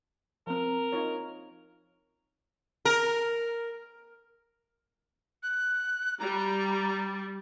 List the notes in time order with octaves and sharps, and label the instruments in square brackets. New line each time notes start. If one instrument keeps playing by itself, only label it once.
[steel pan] F3 C4 [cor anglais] A#4
[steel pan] D#4 F4 C#5
[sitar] A#4
[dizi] F#6
[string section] G3 [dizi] A#5